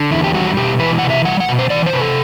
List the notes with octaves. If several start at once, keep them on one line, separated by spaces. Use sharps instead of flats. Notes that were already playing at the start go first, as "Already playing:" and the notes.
Already playing: D3
E2 E4
G4
G3 F#4
B2 G4
E3 B4
C3 F#5
E5
G3 F#5
F#5
B2
C5
E3 D5
C5
C3 B4
A4